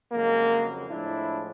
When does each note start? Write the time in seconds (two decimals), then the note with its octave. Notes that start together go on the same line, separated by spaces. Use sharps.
0.12 F2 C#3 F#3 G#3 A#3
0.88 A2 F3 G#3 D4 E4